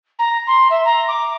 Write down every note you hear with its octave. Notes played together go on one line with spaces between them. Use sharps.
A#5
C6
E5
A#5
D6